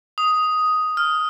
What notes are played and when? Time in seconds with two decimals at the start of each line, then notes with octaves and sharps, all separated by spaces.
0.18 D#6
0.97 F6